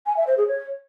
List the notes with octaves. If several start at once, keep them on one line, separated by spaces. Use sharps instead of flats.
G#5
E5
C5
G#4
C#5